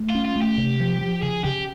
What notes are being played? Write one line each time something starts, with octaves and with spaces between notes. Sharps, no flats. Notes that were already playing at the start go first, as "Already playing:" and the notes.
Already playing: A3
F4
C#4
F4
A3
G4
C3
F3
F3
C#3 G#4
C#3 G4